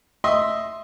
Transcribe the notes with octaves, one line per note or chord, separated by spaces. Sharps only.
D#5 E5 C6